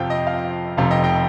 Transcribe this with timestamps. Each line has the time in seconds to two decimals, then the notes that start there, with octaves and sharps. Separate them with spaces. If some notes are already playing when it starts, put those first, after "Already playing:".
Already playing: F2 C3 F3 F5 G5
0.10 D#5
0.27 F5
0.78 F1 F2 C3 F5
0.91 D#5 G5
1.03 D#5 G5